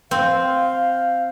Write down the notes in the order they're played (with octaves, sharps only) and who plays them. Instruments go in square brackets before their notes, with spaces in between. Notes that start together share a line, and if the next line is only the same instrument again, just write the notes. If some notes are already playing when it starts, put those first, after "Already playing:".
[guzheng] C4 [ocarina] F5